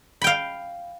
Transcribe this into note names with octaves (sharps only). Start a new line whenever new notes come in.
F5 G5 B5